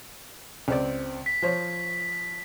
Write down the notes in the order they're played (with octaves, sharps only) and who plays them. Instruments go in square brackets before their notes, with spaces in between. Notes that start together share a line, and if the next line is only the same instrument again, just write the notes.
[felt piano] C#2 C4 D5
[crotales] B6
[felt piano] F3 C5 C#5